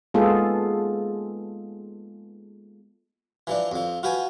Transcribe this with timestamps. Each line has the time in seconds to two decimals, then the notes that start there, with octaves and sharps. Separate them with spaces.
0.14 G#3 A#3 B3 F4 G#4 A4
3.47 E3 F3 D4
3.72 F2 F3
4.03 F4 F#4 B4 G5 G#5